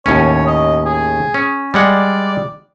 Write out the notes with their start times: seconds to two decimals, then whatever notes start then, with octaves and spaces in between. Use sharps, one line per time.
0.06 D#2 A2 C#4 C#5
0.46 D#5
0.85 G#4
1.34 C#4
1.74 G3 G#3 D5 F#5